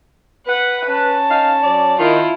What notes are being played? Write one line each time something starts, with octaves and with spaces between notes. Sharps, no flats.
B4 F#5
C#4 A5
D#4 F5
F#3 D5
D#3 E4 F4